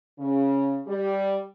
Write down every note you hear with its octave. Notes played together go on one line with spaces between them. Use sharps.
C#3
G3